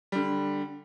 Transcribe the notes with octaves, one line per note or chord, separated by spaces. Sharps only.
D3 G3